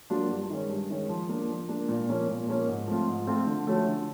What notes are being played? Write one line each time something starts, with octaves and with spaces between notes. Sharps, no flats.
F#3 A#3 D4 F4
G2
D#3 G#3 C#4
G2
D#3 G#3 C#4
F3
A#3 D4
F3
A#3 D4
A#2
F3 A#3 C#4
A#2
F3 A#3 C#4
G#2
F3 A3 C4 F4
G#2
F3 A3 C4 F4
D3
F3 A3 C#4 F#4
D3